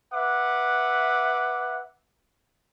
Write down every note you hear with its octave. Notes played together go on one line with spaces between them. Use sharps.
B4 E5 F#5 D6